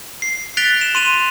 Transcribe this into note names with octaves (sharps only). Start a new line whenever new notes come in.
C7
F#6 A6 B6 D7 F7 G7
E7
C6 D#7 F7